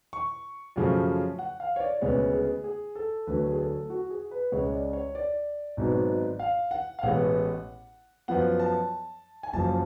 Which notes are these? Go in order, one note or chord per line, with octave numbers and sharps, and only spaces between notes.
C#6
F#2 C#3 F3 A3
F#5
F5
C#5
D5
D2 C#3 G#3 B3 C#5
G#4
G#4
A4
D2 D3 F#3 A3 B4
G#4
A4
F#4
G#4
B4
C#2 C#3 G#3 C#5
D5
C#5
D5
G#1 G#2 F#3 B3
F5
F#5
F5
A1 A2 G#3 B3 F#5
F#2 F3 B3 F#5
A5
G#5
F#1 F#2 F3 A5